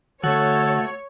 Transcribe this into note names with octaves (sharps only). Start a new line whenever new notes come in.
D3 A3 F#4 A4 C#5